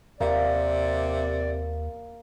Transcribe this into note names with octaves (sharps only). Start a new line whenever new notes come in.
D#2 C3 A#3 D5